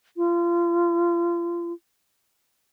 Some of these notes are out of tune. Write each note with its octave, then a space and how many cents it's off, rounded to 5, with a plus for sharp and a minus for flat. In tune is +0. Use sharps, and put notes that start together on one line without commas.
F4 -30